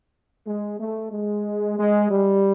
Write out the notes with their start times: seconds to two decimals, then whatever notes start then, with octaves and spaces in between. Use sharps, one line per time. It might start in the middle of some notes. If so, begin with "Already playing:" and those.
0.46 G#3
0.80 A3
1.12 G#3
1.78 G#3
2.10 G3